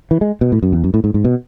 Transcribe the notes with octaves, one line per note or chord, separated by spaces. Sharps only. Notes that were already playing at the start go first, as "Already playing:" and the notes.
E3
G#3
B2
A2
F#2
E2
F#2
A2
G#2
G#2
B2